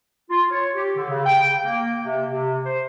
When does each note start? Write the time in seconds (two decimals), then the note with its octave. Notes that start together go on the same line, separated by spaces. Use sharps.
0.30 F4
0.51 C#5
0.75 G4
0.96 D3
1.10 C#3
1.26 G5
1.65 A#3
2.03 C3
2.29 C3
2.66 C5